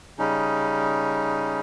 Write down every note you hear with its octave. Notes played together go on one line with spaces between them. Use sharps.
C#3 G3 C#4 D#4